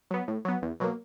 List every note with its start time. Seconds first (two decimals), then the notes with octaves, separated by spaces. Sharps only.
0.11 F#3 B3
0.28 A2
0.45 F#3 B3
0.62 E2
0.80 B2 F#3 A#3